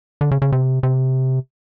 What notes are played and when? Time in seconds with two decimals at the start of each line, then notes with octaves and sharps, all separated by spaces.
0.21 D3
0.31 C#3
0.42 C#3
0.52 C3
0.83 C3